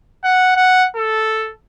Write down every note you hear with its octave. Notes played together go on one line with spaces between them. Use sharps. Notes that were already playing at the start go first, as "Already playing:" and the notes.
F#5
F#5
A4